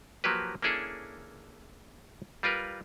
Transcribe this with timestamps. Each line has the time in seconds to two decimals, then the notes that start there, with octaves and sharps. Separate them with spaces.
0.24 F3 F#3 A#3 G4 B4
0.62 A#3 C#4 D4 E4 G#4 A4
2.43 G3 F4 A#4 B4